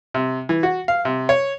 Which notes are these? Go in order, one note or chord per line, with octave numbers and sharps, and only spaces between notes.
C3
E3
F#4
F5
C3
C#5